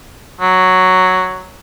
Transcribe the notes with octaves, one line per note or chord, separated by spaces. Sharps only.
F#3